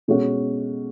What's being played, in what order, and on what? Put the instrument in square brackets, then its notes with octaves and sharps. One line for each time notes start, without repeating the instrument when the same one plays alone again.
[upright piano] B2 G#3 C#4 F#4